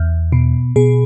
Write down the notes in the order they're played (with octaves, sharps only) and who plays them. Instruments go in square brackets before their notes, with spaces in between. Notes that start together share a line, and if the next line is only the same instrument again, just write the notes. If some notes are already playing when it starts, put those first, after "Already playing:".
Already playing: [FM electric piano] E2
B2
B2 G#4